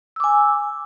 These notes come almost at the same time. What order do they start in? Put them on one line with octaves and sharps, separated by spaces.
E6 D6 G#5